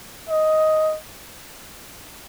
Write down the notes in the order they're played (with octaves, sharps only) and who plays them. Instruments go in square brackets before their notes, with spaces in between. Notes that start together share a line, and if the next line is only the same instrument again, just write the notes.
[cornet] D#5